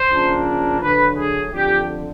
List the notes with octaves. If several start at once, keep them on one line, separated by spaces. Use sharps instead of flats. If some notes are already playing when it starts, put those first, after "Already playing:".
Already playing: C5
C#3 F3 A#3 D4
D3 F#3 A3 B4
G#4
F2 D3 F3 G4